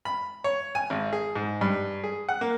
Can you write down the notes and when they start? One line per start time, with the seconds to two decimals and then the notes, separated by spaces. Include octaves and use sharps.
0.05 B5
0.44 C#5
0.75 G#5
0.90 G#1
1.13 G#4
1.36 G#2
1.61 G2
2.04 G#4
2.29 F#5
2.41 A#3